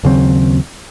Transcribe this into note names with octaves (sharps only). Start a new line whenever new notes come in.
D#2 C#3 F#3 C4